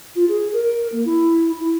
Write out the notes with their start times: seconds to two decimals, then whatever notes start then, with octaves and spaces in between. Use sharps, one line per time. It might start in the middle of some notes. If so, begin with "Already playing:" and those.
0.16 F4
0.29 G#4
0.53 A#4
0.92 A#3
1.06 E4
1.60 E4